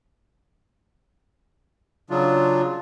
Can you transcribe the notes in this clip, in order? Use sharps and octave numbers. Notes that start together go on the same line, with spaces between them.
C#3 F#3 D4 F4